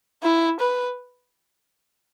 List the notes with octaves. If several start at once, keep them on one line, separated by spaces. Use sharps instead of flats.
E4
B4